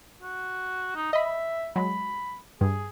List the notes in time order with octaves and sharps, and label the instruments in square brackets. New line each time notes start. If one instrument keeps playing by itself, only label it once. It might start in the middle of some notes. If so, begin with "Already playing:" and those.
[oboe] F#4
D#4
[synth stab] D#5 B5 [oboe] E5
[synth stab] F#3 G#3 [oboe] B5
[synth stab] G2 [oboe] G#4